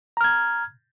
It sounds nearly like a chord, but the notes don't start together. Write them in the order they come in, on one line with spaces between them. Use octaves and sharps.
A#5 F6 G#6